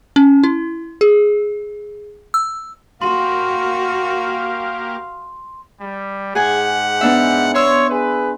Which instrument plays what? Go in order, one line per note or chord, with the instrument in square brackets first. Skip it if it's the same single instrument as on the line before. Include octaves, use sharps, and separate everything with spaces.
[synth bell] C#4
E4
G#4
E6
[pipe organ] A#3 G4 A#4 [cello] F#4 [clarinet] F5 [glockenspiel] C6
[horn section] G3
[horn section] G#2 G4 F#5 [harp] G#4 G#5
[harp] B3 D4 E5
[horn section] C#5 [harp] C6 E6
[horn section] G#4 B4